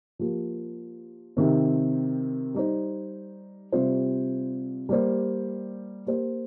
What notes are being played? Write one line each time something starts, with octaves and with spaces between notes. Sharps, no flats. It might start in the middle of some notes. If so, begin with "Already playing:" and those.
F3 A#3 G4
C3 D#3 C4
G3 D#4 C5
C3 G3 C4 F4 C5
G3 A#3 G4 C5
A#3 G4 C5